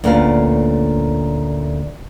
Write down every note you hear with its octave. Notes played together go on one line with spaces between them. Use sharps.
D2 A#2 A3 C#4 B4 F5